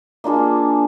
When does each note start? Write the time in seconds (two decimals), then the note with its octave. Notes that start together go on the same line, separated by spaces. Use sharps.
0.24 A#3 D4 F4 G#4